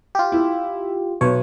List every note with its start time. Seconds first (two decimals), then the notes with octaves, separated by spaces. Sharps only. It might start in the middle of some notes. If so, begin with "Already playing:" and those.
0.15 F4 G4
0.32 E4
1.21 B1 C#5